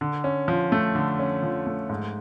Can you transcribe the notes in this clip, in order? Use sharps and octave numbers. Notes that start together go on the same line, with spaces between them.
D3
C#4
F3
A3
D3
C#4
F3
A3
G#2